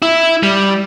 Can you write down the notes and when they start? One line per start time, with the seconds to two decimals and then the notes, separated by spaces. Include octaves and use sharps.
0.02 E4
0.43 G3